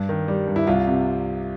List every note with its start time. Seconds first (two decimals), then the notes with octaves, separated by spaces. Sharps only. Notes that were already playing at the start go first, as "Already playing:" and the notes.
Already playing: G2
0.09 D#3
0.28 G3
0.48 G2
0.56 E4
0.67 C2 F4
0.87 C3